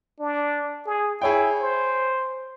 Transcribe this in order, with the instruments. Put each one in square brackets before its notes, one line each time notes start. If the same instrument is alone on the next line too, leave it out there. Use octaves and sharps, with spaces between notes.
[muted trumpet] D4
G#4
[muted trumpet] E4 [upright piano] G#4 C#5 G5
[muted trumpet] C5